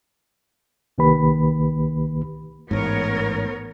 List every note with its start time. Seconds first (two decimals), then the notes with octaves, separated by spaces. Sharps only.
0.98 C2 D#3 A#3 G4 B4 B5
2.71 A1 G#2 B3 A#4 C#5